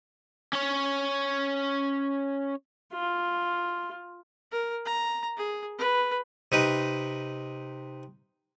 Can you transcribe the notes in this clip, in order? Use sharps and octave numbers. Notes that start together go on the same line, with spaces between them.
C#4 C#5
F4
A#4
A#5
G#4
B4
C3 D#4 B4 B5